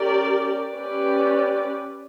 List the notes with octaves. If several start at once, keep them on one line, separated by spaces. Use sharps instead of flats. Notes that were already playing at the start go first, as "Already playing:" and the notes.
Already playing: C#4 G4 A#4 D5
C#4 G4 B4 D5